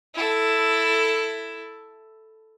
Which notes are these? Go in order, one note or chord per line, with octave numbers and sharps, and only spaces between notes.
E4 A4